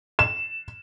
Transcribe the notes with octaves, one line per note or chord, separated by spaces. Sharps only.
E7